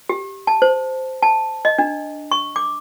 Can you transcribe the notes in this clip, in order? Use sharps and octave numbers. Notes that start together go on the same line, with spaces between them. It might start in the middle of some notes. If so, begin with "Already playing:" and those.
G4
A5
C5
A5
D#5
D4
C#6
D6